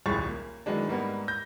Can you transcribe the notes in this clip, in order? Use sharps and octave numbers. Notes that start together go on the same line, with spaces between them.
D#1 C2 F2 G#4 C#6 A6
A#3
D#3 E3 F#3 G#3 D4
G#2 G3 A#3 B3
G6 A#6